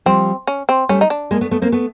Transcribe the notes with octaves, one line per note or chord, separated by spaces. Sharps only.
F3 G3 C4
C#4
C4
G3 A3 C#4
D#4
D4
G#3 A#3
A3 B3
A3 B3
A#3 C4
A3 B3